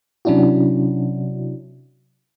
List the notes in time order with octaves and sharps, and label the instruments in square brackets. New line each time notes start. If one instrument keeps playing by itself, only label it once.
[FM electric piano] C3 F#3 C#4 D4 E4 F#4